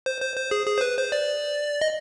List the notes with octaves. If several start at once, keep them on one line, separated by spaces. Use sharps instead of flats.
C5
C5
C5
G#4
G#4
C5
B4
C5
D5
D#5